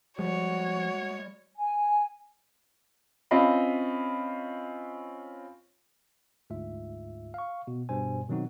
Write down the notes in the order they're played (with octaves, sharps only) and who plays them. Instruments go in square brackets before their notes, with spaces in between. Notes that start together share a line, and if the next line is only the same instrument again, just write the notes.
[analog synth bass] F3 [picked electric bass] G3 G#3 [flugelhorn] F#4 [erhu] C#5
[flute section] G#5
[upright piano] C4 C#4 F4 D#5 F5 B5
[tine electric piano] D2 G#2 F4 E5
F5 C#6
B2
G1 G2 B2 G3 C5 G#5
B2 D#3 F#3 C4 D#4 F#4